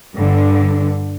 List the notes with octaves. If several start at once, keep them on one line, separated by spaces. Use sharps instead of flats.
G2 D3